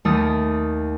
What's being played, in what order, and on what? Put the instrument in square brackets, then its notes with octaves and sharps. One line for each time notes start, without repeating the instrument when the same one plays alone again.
[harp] D#2 A3 D#6 A6